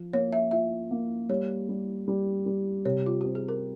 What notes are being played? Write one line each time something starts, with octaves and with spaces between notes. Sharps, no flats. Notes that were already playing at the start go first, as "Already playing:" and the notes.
Already playing: F3
A#3 C#5
E5
F4 E5
A#3
G3 C#5
G3
G3
G3
C3 C#5
F4
C4 G4
G#4
A#4